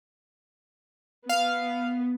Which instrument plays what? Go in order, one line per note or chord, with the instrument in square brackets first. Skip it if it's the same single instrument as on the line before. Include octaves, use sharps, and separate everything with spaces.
[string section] B3 [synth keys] F5